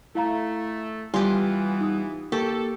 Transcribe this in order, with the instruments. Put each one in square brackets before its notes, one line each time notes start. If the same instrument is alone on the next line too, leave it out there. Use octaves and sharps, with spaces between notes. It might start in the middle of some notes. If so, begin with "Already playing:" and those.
[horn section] A3 [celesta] E4 F5 A#5
[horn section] E3 B3 [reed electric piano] G3 [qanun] F4 G4 [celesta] G#5 C6
[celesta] D#4 D#6
[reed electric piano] A#3 [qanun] G4 [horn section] A4 [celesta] C#6